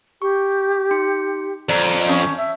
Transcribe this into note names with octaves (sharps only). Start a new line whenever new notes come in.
G4 C#6
D#4 C6 C#7
F2 D5 A#5
C#4 A5 D#6 G6
E5